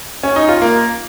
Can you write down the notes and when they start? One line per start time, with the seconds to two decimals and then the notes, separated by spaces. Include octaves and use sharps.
0.23 C#4
0.36 D#4
0.48 F4
0.62 A#3